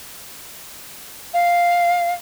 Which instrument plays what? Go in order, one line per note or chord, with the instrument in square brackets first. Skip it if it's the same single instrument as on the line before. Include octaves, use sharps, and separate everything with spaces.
[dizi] F5